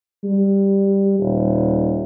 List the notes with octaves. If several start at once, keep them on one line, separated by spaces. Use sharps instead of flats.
G3
D#1